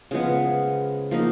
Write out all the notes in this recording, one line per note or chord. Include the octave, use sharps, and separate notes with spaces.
C#3 F3 G#3 B3
F3 A#3 D#4